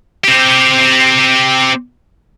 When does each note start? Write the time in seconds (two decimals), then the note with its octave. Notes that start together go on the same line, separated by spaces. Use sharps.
0.24 C4 G4